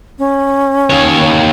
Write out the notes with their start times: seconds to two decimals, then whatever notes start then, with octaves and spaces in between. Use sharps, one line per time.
0.19 C#4
0.90 D#2 C#5